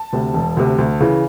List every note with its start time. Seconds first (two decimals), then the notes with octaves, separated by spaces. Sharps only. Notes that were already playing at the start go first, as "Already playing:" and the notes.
Already playing: A5
0.13 D2 C3
0.34 E1
0.57 D2 C3
0.78 D2
1.00 C#3 E3